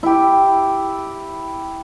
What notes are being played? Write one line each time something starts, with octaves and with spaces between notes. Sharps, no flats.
E4 G4